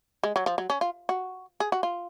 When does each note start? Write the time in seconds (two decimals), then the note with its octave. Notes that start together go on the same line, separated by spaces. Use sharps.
0.23 G#3
0.36 F#3
0.46 F3
0.58 F#3
0.70 C#4
0.81 F4
1.09 F#4
1.60 G#4
1.72 F#4
1.83 F4